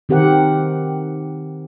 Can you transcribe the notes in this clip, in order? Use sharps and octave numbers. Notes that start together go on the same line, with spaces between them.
D#3 C4 G4 A#4 F#5